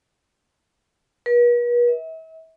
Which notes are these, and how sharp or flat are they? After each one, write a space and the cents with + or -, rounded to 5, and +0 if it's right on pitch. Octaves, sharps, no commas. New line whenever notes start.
B4 -45
E5 -40